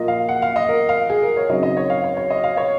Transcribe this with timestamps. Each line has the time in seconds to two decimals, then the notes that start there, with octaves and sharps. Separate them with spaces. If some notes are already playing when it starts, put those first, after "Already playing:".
Already playing: A#2 F3 A#3 F4 D#5
0.08 F5
0.29 F#5
0.42 F5
0.56 D#5
0.69 A#4
0.89 F5
1.10 G#4
1.23 A#4
1.37 C#5
1.49 C#3 F#3 C4 D#4 D#5
1.63 D#5
1.77 C#5
1.90 F5
2.04 C#5
2.17 C#5
2.30 D#5
2.44 F5
2.57 C#5